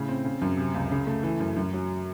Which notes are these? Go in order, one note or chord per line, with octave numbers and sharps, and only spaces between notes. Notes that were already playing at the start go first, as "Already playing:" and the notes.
Already playing: A2 C#3
C4
C#3
F#2
C3
C#2
C#3
A3
E3
F#2
F#2
F#3